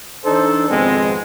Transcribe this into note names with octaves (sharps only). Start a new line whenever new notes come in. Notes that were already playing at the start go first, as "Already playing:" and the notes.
E3 D4 D#4 A4 C5
G#1 F2 B2 G#3 B3 C4